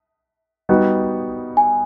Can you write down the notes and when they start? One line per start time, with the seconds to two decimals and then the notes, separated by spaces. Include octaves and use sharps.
0.69 G3 B3 D#4 F#4
1.57 G#5